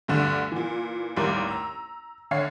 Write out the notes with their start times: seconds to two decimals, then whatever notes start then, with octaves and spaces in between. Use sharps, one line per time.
0.08 D2 G2 D3 E7
0.52 A#2 E3
1.17 A1 D#2 G3 A#4 D6
1.48 A#5 E6
2.31 D3 C#5 F5 C7